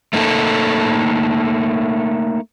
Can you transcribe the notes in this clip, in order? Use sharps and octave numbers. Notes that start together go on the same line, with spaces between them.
A3 A#3 D#4 A4